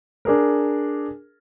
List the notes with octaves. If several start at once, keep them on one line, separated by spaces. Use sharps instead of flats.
D4 G#4 A#4